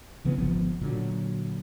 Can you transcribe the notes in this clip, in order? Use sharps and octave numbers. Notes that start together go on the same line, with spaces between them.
C#2 C#3 E3 B3
G#1 D3 F3 B3
A#2 D3 F#3